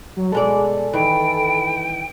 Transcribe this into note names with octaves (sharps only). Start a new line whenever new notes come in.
F#3
B2 G#3 A4 D5
D#3 E3 G5